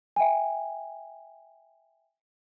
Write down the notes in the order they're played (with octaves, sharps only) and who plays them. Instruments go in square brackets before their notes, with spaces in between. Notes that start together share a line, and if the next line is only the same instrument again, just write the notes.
[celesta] E5 G5 G#5